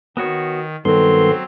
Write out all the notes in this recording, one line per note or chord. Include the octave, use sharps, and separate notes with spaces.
D#3 B3 F#4 C#5
G2 D#3 F#3 B3 C4 A4 C6